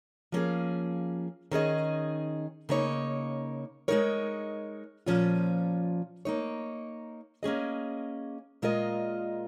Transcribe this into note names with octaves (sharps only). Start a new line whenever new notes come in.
F3 A#3 C#4 G#4
D#3 C#4 G#4 D#5
C#3 A#3 D#4 C#5
G#3 D#4 A#4 C#5
A#2 F3 C#4 F4
A#3 D#4 C#5
A#3 C#4 G#4 D#5
A#2 G#3 F4 A#4 D#5